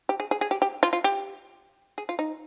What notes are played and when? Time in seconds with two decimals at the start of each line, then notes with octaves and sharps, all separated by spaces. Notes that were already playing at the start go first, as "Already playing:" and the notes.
0.09 G4
0.20 G#4
0.31 G#4
0.41 G#4
0.51 G4
0.62 G4
0.83 F4
0.93 F4
1.04 G4
1.98 G#4
2.09 F4
2.19 D#4